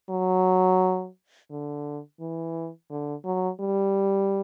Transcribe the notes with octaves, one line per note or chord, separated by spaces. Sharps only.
F#3
D3
E3
D3
F#3
G3